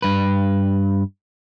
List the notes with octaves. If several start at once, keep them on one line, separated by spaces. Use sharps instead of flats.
G2 B4